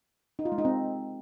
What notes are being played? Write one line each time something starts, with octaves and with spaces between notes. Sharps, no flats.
D#4
F4
G#3
D#4
C4